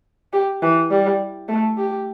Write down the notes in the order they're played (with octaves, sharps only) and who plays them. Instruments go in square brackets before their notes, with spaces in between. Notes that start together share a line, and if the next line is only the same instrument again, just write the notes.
[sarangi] G4
E3
G3
A3
G4